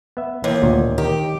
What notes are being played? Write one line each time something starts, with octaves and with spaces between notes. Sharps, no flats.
B3 E5
D#2 E3
D2 A#2
D#3 G4 A#4